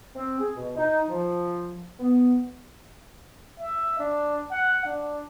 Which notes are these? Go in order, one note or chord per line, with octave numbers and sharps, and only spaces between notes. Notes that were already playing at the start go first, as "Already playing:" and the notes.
C4
G#4
B2
D#4
F3
B3
E5
D4
F#5
D4